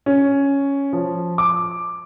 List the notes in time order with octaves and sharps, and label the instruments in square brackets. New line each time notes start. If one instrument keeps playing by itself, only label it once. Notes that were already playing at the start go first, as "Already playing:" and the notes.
[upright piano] C#4
F3
D6